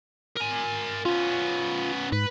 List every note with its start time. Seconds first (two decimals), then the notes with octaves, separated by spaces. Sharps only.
0.37 A#4 G#5
1.05 B3 C#4 F4
2.12 G#2 B4